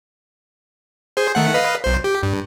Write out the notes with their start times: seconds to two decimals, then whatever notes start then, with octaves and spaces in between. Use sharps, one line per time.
1.17 G#4 C5
1.35 D#3 A3 F#5
1.54 B4 D#5 F5
1.84 B1 C5
2.04 G4
2.23 G2